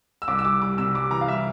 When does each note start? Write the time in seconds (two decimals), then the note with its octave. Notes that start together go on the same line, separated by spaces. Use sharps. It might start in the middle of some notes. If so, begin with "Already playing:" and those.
0.22 E6
0.28 C2 D6
0.39 E6
0.45 G3 D6
0.62 G3 D6
0.78 C3 E6
0.94 G3 D6
1.11 E3 A#5
1.21 F5
1.28 G3 E5